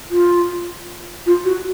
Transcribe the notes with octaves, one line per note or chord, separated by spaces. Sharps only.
F4
F4
F#4